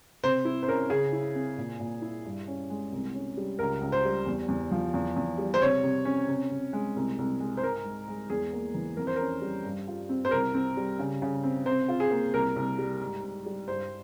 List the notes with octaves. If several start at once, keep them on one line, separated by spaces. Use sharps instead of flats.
C3 C5
E4
C5
C#4 A#4
C#3 G#4
E4
C4
A#2
A#2
E4
G2
C#4
G#3
C2
C#4
G3
C#2 A#4
C#2
C5
G3
E2
E2
F3
E2
E2
G3
C5
C3 C#5
C3
C#4
C3
C3
G#3
C2
C2
G#3
C5
G#2 A#4
G#2
G#3
E2 G#4
A#3
E3
F2 A#4
C5
C#4 A#4
G3
G2
F4
C4
C5
C2 A#4
C4
G3
C#3
C#3
C4
C3 C5
F4
G#4
A#3
C2 A#4
C2
G3
G#2
G#2
G3
G2 C5